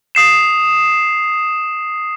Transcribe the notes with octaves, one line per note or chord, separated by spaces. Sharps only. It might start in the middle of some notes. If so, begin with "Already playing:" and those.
D#6 C7 E7